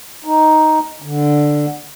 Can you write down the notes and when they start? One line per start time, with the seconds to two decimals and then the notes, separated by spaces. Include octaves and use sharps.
0.25 D#4
1.02 D3